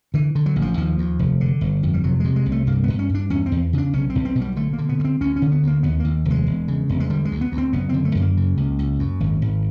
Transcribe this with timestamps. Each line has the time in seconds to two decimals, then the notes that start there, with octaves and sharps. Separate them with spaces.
0.14 D3 E3
0.35 D3
0.46 F#3
0.56 A1
0.62 F3
0.77 D#2 F3
0.98 D#2
1.19 F1
1.41 D3
1.61 G1
1.83 F2
1.94 G3
2.04 C3 F#3
2.20 C3 G#3
2.36 G#3
2.46 C2
2.52 A3
2.67 G2 A#3
2.83 G2 B3
2.99 C#4
3.09 G2
3.15 D4
3.30 E2 C#4
3.46 C4
3.52 E2
3.73 C#3 D4
3.93 B1 C#4
4.10 C4
4.15 B1
4.25 C4
4.35 B2
4.41 G3
4.56 D3 A3
4.73 A#3
4.78 D3
4.89 B3
4.99 G2
5.05 C4
5.21 D2 C#4
5.36 C#4
5.42 D3
5.52 B3
5.63 D2 A#3
5.83 D#2 B3
6.00 D#2 A#3
6.25 F1
6.31 G#3
6.47 E1
6.68 C#3
6.89 E1
7.00 G#3
7.10 D3 G3
7.25 G#3
7.31 D2
7.41 B3
7.52 D2
7.58 C4
7.73 F#1 B3
7.89 D3 C4
8.05 A3
8.15 F#2
8.21 A#3
8.37 C#3
8.57 C#2
8.79 C#2
8.99 F#2
9.20 G#1
9.42 G#1